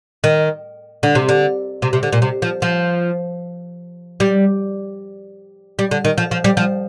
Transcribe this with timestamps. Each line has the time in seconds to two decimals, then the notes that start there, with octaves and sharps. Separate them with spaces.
0.24 D#3
1.03 D3
1.15 C3
1.29 D3
1.82 C3
1.93 C3
2.03 D3
2.12 A#2
2.22 C3
2.42 F3
2.62 F3
4.20 G3
5.79 G3
5.91 D3
6.05 D#3
6.18 F3
6.31 F3
6.44 G3
6.57 F3